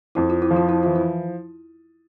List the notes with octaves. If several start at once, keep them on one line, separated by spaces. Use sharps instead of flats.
F2 E4
F4
E4
F3
F4
E4
E3 F4
E4